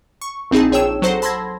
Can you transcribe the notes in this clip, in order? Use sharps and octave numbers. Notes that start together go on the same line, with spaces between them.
C#6
A#1 C4 D#4 G#4 A5
A#1 G#4 C#5 G5 E6 E7
F#3 A4 C5 F#5 A#6 C7
A5 B5 C6 E6 G#6 A#6